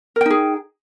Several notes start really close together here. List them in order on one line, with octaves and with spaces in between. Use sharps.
A#4 G5 D#4 G#4